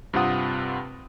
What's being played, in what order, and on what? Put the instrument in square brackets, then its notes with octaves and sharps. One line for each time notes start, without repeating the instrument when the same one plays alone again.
[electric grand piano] G2 C3 C4 F4 F#5 D#6